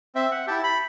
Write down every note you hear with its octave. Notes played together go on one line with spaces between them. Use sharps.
C4 E5
F#5
E4 G4 A5
B5